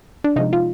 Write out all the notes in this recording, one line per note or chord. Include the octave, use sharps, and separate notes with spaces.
D4
C3 F3 G#3 D#4
F4